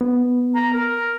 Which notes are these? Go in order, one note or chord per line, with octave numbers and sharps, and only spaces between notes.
B3
A#5
A#4